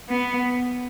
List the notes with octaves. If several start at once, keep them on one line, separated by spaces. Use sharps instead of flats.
B3